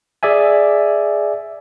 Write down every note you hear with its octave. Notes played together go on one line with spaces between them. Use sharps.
G#4 D5 E5 G#5